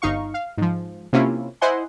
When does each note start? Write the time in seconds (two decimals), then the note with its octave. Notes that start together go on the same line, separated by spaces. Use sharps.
0.02 G1 D#4 F5 C#6
0.34 F5
0.57 G#2 F3
1.13 C3 A#3 C#4 E4 F4
1.61 E4 C5 D#5 F#5 G#5 C6